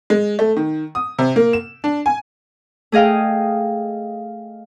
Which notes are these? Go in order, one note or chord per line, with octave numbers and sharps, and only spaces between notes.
G#3
A3
D#3
D#6
C3
A#3
E7
D4
G#5
A3 G#4 D#5 F5 G5